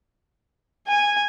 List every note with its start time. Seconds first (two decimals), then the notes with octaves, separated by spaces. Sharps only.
0.88 G#5